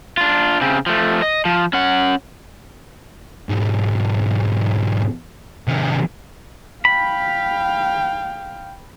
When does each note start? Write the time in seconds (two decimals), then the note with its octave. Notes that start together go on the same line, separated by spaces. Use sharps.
0.17 D4 F4
0.62 C#3 C4
0.86 F3 A3
1.22 D#5
1.45 F3
1.73 C#4 F#5
3.49 B1 G#2
5.68 C3 D#3
6.85 F5 G5 B5